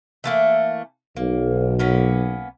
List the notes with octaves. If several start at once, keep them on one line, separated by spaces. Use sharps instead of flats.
E3 A3 A#3
B1 A#3
A#3 B3 C#4